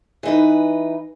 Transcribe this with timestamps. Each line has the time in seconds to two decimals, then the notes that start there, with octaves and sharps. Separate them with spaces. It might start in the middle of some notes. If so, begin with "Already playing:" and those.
0.23 E3 D#4 B4